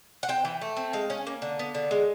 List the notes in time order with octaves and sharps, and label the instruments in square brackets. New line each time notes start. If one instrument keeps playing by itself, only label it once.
[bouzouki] F#5
C4 G5
E3
A3
C4
G#3 F5
C#4
A#3
D3
B3
D3
G#3